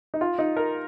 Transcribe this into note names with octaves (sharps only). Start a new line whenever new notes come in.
D#4
F4
D#4
A#4